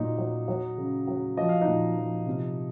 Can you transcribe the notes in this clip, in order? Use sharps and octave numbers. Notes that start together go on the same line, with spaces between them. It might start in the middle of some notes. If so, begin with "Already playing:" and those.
Already playing: A#2 F#3 D#4
F#3
F#3
C#3
F#3
F3 D#5
F5
D#4 D#5
A#2
F3
C3